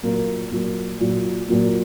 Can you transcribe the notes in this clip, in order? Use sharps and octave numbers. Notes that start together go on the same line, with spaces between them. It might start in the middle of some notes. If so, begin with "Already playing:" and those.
A#2 F#3 A#3
A#2 F#3 A#3
A#2 F#3 A#3
A#2 F#3 A#3